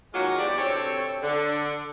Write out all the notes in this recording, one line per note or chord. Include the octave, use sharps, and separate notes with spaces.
D#3 F#3 G#3 A#3 F4 F#4
E2 G4 D5
D2 C3 C4 A4 C#5
D3